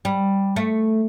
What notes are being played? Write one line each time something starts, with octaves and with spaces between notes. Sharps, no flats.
G3
A3